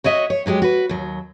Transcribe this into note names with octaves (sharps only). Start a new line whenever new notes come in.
F#4 C#5 D#5 E5 F#5
C#5
G2 F#3 G#3 G4
F#4 B4
D#2 F#3